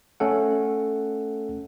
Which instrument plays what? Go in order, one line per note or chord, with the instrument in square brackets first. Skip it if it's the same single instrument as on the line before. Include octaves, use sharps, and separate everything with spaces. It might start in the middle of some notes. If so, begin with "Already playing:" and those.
[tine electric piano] A3 C#4 A4 F#5